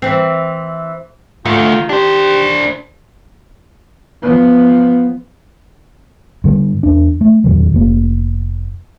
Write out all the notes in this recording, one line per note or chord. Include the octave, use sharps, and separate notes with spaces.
E3 C4
D2 D#3 A3 F4
D4 G4 C5
F3 B3
G2 D3 G3
E2 D4
A3
E2 A#2 D#3 F#3
F1 A#3